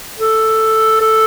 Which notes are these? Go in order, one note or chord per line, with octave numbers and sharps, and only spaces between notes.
A4
A4